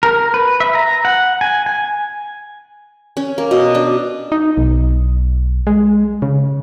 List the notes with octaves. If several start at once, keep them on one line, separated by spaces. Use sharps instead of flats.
A#4
B4
E5
A#5
F#5
G#5
G#5
C#4
A#3
B2
D4
D#4
B1
G#3
C#3